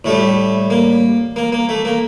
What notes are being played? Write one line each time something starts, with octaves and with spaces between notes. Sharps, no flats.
A2 G3 A3
A#3
A#3
A#3
A3
A#3